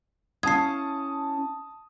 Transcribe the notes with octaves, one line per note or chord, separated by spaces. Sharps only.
C#4 E4 F5 A5 D#6 G#6 C7